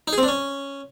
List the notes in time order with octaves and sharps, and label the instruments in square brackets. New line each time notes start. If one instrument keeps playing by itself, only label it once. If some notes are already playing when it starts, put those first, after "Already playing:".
[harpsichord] D#4
G#4
C4
D4
C#4